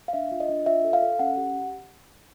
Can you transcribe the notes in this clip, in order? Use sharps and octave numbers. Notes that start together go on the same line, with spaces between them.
F5
D4 E5
F4
D#5
D4
F4 E5
A4
F5
A4
C#4 F#5
G4